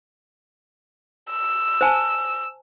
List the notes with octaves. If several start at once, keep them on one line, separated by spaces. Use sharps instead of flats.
E6
C5 G#5 A5